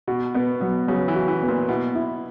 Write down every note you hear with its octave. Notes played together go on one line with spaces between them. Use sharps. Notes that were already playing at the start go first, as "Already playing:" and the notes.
B2 F#4
B2 B3
B2 F#3
C#3 F#3
E3
F#4
E3
B3
A#2
B2 E4
E4